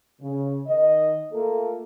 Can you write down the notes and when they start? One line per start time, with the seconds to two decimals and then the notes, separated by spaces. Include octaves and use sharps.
0.21 C#3
0.67 D#3 D#5
1.32 A3 A#3 F4 A4